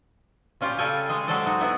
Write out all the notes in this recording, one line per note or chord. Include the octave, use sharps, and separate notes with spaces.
A#2 C#4 F4 G4
C#3 G3 A4 F5 G5 G#5
G#3 G#4 D#5
F#3 G#3 G4 A4 C5 D5
D#4 F#4
B3 E4 F#4 G#4